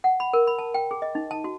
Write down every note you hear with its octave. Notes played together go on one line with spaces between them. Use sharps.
F#5
B5
A#4
B5
A5
G5
G#4
D#5
D#4
A5
F#4